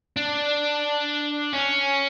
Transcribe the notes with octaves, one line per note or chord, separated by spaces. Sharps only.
D4
C#4